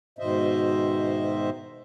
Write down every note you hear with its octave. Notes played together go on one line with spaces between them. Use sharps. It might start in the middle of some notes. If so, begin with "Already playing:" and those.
G#2 B2 D#3 C5 D#5 E5